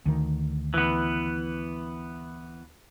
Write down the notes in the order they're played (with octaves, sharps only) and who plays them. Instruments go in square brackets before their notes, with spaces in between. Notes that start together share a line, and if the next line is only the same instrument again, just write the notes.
[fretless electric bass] D2 D#3
[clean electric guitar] E3 B3